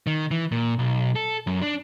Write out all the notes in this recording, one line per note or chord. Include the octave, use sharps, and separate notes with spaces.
D#3
E3
A#2
B1
A4
F#2
D4